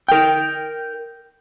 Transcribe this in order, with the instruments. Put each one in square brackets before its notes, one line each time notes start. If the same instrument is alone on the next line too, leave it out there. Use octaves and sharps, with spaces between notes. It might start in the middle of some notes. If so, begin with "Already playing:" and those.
[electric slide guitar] A#4 G5